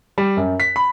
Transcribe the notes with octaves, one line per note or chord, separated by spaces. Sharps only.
G3
F#2
B6
B5